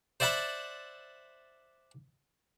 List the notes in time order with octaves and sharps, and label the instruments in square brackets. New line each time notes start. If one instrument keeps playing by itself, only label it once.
[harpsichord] C5 D5 E5 F#5 A5 B5